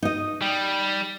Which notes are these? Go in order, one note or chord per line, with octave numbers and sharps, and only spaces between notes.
D#4 D#5
G3